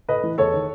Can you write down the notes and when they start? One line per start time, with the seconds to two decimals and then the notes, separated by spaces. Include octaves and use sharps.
0.09 A2 B4 D#5
0.23 E3
0.38 E2 A4 C#5
0.54 D#3